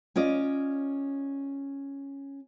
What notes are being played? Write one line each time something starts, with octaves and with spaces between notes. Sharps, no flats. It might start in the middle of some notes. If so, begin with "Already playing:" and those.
C#4 F4 D5 D#5